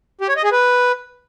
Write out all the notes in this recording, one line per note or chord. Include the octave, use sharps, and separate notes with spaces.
G4
C#5
D#5
G#4
B4